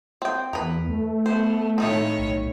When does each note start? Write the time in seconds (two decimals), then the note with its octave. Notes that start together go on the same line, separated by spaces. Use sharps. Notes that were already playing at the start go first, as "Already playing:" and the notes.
0.22 C4 G5
0.53 E2 A#4 B4
0.89 A3
1.26 B3 C5
1.78 A2 D#3 C4 D#4 F4 C#5
2.18 B1